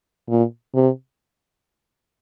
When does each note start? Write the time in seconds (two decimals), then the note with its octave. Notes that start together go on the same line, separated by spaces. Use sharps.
0.29 A#2
0.75 C3